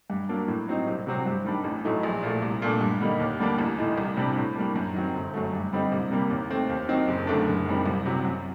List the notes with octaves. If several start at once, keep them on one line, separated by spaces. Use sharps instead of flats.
G2
F#3 A#3 D4
A2
F#3 C4 D#4
C2
C3 F#3 C4
G2
D#3 G3 D4
A1
A2 F#3 A3 D#4
A#1
A#2 A3
C2
A#2 A3 D4
G2
D3 G3 A#3 D#4
D#2
D3 G3 A#3 D4
A1
A2 A3 D#4
C2
C3 G3 D4
A2
G3 A#3 D4
F#2
D#3 F#3 C4
G1
F#2 F#3 A3
G2
D3 G3 C4 D#4
C2
C3 G3 A#3
D#2
D#3 A3 C4
D#2
D#3 F#3 C4 D#4
F#1
F#2 D3 A3 D4
F#1
F#2 D#3 G3 C4
C2
C3 F#3
F#2